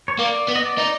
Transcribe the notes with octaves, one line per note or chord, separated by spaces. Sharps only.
C#5
A#3 D5
B3
D#5
D5
D#4